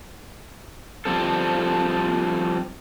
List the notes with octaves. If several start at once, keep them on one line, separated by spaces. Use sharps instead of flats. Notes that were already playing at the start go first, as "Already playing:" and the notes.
F3 G3 C4 A4